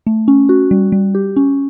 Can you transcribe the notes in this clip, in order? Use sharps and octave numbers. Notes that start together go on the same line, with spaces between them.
A3
C#4
F#4
G3
G3
G4
C#4